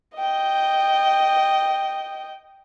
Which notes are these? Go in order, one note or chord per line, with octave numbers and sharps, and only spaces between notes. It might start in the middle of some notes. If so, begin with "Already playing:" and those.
D#5 G5